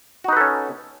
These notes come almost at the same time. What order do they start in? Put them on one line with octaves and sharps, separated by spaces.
F#4 D#4 B4 A4 C#4